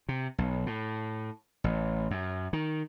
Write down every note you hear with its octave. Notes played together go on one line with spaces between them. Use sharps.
C3
B1
A2
A1
F#2
D#3